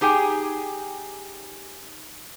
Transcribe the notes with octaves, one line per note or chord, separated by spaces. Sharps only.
D#4 G4 G#4 G5